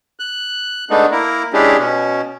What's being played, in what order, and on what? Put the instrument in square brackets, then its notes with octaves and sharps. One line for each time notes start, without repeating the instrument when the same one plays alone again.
[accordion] F#6
G#3 A3 B3 D4 D#4
A#3 E4 A#4
G#3 C#4 D4 E4 G4 G#4
B2 C#4